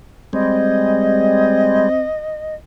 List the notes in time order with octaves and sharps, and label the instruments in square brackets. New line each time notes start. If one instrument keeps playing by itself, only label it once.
[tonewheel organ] G3 G#3 [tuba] C4 [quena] D#5